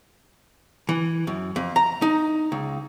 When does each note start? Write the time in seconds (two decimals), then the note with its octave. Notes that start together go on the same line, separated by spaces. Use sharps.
0.89 E3
1.27 F#2
1.56 F2
1.76 A#5
2.02 D#4
2.52 C#2